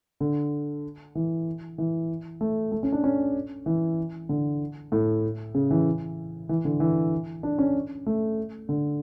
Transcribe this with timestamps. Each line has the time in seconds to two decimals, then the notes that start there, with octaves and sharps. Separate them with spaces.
0.21 D3
1.15 E3
1.78 E3
2.41 A3
2.72 A3
2.83 C#4
2.92 D4
3.04 C#4
3.66 E3
4.29 D3
4.92 A2
5.54 C#3
5.71 E3
6.49 E3
6.65 D3
6.80 E3
7.43 D4
7.59 C#4
8.06 A3
8.69 D3